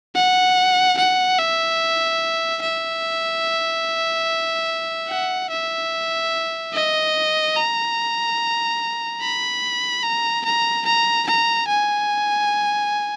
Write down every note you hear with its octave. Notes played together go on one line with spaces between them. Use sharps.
F#5
F#5
E5
E5
F#5
E5
D#5
A#5
B5
A#5
A#5
A#5
A#5
G#5